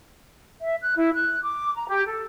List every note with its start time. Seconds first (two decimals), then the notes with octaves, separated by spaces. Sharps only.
0.62 E5
0.81 F#6
0.97 E4
1.14 F#6
1.42 D6
1.74 A#5
1.88 G4
2.07 A4